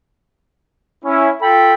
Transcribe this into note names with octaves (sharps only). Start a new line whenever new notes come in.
C#4 E4
F4 A4 G5 B5